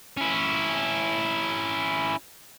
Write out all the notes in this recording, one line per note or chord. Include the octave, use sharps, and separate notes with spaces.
C#4 E4